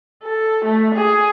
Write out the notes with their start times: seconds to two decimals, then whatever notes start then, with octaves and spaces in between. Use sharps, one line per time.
0.23 A4
0.65 A3
0.95 G#4